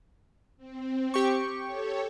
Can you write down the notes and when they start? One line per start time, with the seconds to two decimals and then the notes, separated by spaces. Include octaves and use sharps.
0.57 C4
1.14 G4 C#6
1.62 A4 C#5